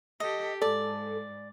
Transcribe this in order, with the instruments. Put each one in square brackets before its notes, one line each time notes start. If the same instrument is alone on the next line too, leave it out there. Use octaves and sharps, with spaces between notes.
[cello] G4 A4 [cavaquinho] D#5
[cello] G#2 [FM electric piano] A4 [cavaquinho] D5